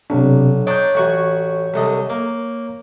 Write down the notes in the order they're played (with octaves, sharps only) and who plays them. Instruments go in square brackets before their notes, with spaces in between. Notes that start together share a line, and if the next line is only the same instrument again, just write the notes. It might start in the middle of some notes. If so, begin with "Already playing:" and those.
[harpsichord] B1 [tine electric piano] C3 C4 D4
[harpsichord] D4 D#4 G5 [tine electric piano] C#5 C#6 G6
[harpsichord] A1 F#4 G#5
C2 D3 D#5
A#3